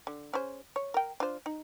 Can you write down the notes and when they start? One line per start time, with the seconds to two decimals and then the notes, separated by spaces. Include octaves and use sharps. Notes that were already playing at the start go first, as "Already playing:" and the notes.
0.07 D3
0.33 C#4 G#4 C5
0.76 C#5
0.94 A#4 G5
1.20 D4 F4 C5
1.46 D#4